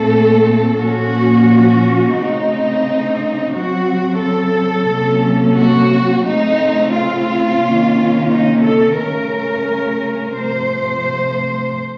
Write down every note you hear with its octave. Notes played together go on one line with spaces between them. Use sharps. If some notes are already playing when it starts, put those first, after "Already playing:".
Already playing: A#2 A3 C4 A4
A#2 F3 A#3 C#4 F#4
C#3 A3 C4 D#4
C#3 F#3 C4 F#4
A4
C3 F#3 A#3 C#4
F#4
C#3 A3 C4 D#4
F4
C3 D#3 A#3 C#4
D#4
A4
C#3 A3 C#4 A#4
C3 F3 A3 C5